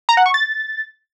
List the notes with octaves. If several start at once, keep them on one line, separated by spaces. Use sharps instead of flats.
A#5
F#5
C#6
A6